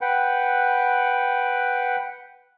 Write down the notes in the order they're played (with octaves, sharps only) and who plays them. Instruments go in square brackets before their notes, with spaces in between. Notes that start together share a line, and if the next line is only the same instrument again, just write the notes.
[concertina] B4 F#5 G5